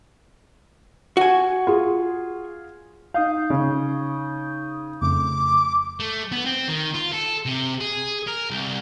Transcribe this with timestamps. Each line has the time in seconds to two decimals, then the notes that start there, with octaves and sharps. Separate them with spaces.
1.17 F#4 G#5
1.67 F4 G#4
3.14 D#4 F5 D#6 G6
3.50 C#3
5.01 F2 C#3 A3 D6
6.00 A3
6.32 B3
6.46 C4
6.68 D#3
6.94 F4
7.12 A4
7.46 C3
7.81 G#4
8.27 A#4
8.50 C2